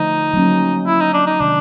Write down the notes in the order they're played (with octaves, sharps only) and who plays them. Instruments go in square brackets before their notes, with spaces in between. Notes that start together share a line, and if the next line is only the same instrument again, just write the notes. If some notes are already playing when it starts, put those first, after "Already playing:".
Already playing: [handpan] D3 F3 A3 [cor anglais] D#4
[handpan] F#3 A#3 C#4
[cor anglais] E4
D#4
D4
D#4
[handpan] C3 D#3 G#3 [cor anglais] D4